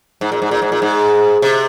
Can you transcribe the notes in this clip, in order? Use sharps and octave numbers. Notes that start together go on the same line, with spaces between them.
G#2
A#2
G#2
A#2
G#2
A#2
G#2
C3